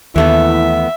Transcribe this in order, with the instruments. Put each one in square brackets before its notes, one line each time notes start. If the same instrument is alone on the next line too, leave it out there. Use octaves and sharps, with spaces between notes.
[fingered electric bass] D#2 [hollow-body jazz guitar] E3 A3 B3 [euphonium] E4 [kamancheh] E5